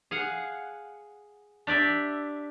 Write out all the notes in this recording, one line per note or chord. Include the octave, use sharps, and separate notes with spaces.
G#4 F5 F#5
D4 G4 D5 E5